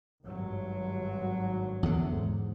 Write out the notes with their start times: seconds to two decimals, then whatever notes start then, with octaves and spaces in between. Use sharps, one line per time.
0.23 G#1 G2 F#3
1.83 E2 D3
2.12 G#2